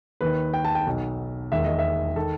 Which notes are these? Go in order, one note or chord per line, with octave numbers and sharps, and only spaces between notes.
D#2 D#3 B4
G5
A5
G5
B1 B2
E1 D#2 D#3 E5
D#5
E5
D#3 A4